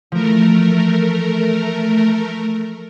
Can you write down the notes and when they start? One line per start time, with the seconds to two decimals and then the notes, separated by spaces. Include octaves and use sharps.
0.12 E3 F3 A3 A#4